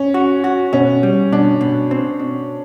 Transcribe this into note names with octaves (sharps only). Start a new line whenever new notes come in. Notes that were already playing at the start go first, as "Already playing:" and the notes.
Already playing: C#4
F#4
F#4
B2 C#4
G3
B2 D4
B2
C4
B2